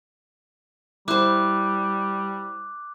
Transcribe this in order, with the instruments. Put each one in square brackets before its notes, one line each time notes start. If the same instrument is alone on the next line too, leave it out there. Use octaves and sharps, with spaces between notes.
[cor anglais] G3 [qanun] E4 C5 [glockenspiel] D6 F#6